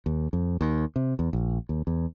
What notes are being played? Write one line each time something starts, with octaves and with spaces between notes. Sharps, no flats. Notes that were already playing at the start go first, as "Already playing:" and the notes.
D#2
F2
D#2
C3
E2
A#1
D#2
E2